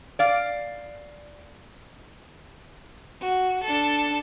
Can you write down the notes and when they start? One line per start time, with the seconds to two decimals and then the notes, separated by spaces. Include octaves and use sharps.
0.19 D5 F5
3.21 F#4
3.64 D4 A4